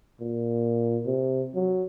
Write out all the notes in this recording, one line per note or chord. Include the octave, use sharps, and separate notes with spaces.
A#2
C3
F#3